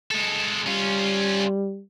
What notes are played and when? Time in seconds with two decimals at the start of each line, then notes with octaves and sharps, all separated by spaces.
0.11 G#3 A4
0.66 G3 C#4 F4